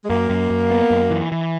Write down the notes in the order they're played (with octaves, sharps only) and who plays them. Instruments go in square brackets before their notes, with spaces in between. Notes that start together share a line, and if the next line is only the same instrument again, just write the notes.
[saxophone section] G#3
[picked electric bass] F#2 [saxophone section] A#3
[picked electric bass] F#2
F#2
B3
F#2
E3
E3